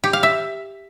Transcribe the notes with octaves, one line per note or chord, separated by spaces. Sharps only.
G4
F5
E5